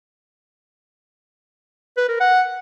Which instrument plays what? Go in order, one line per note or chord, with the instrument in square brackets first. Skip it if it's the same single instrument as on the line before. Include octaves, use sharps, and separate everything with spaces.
[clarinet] B4
A#4
F#5